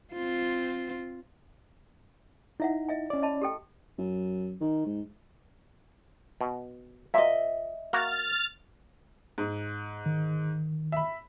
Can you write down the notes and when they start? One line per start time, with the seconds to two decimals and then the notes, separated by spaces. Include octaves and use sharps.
0.13 C4 F4
2.60 D#4 E4 E5 F#5
2.88 D#5 E5 G#5
3.10 C#4 D5
3.22 D#5 A5 B5
3.41 G4 A4 G5
3.98 F#2
4.61 D#3
4.86 G#2
6.41 B2
7.14 A#2 D#5 E5
7.93 A#3 F#4 F6 A6
9.38 G#2
10.06 D#3
10.92 E5 B5